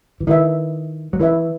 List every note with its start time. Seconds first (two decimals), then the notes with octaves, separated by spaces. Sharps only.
0.20 E3
0.27 D#3 E4 B4 E5
1.13 F#3
1.19 E3 E4 B4 E5